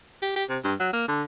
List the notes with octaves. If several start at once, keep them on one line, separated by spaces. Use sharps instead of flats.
G4
G4
C3
G2
F#3
A#3
D3